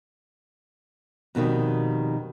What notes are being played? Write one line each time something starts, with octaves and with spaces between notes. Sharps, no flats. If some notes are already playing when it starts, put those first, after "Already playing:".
F2 B2 D#3 G3